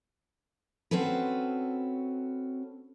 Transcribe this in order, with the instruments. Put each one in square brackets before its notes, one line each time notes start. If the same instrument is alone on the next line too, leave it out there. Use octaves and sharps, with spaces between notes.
[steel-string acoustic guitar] C4 C#4 F#4 A4 B4